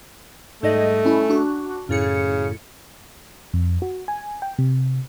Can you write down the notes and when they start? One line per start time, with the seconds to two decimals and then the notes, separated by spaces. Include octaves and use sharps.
0.63 G#2 G3 A3 D#5
1.05 C#4 E4
1.30 D4 F#4
1.89 F#2 A2 C#3 C#7
3.54 F2
3.82 F#4
4.08 G#5
4.42 G5
4.58 C3